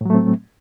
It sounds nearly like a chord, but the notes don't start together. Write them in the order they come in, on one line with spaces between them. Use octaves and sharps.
A2 F#3 A3 C4